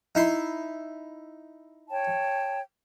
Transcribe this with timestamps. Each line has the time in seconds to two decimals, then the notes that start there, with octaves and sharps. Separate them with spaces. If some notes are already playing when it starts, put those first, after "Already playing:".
0.15 D#4 E4 C6
1.90 C#5 G5 A5